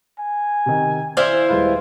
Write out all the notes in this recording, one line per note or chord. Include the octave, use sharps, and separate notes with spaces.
G#5
C3 D#3
E4 C5 D5 F5
D#1 G#3 F4 B4